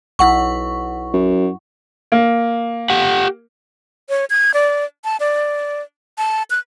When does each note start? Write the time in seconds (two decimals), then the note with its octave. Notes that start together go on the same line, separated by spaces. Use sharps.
0.19 B1 E4 F#5 C#6
1.13 F#2
2.12 A#3
2.90 G4 F#5
4.09 C#5
4.30 G#6
4.54 D5
5.04 A5
5.20 D5
6.18 A5
6.50 F#6